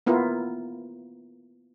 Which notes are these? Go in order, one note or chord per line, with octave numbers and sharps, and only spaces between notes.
A#3 B3 E4 F4 A#4